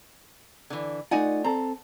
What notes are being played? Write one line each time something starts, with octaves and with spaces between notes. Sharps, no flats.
D3 E3
A3 D#4 F4 D5 F#5 G#5
C4 A4 A#5